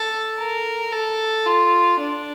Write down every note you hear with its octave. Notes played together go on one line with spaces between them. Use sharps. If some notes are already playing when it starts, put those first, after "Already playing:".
Already playing: A4
A#4
A4
F4
D4